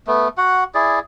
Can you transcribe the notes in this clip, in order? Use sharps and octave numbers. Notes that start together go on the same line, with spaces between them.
A3 B3
F#4 F#5
E4 G#4 D5